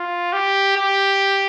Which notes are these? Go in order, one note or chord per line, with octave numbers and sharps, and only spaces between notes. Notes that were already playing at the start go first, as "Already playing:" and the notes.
Already playing: F4
G4
G4